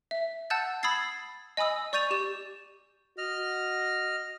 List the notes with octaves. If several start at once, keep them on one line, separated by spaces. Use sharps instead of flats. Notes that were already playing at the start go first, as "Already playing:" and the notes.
E5
F#5 A5 E6 F#6 G6 A6
B5 D#6 E6 G#6 A6 C7
D#5 G#5 B5 D#6 E6
D5 C#6 G6 A6 D#7 F7
G4 E7
F#4 D#5 F6